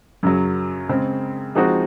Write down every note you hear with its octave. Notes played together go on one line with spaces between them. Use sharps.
F#2 C#3 F#3
C#3 G#3 C4
F3 G#3 C4 D#4 F#4